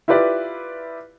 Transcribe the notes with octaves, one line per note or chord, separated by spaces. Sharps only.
E4 F4 G4 B4 D5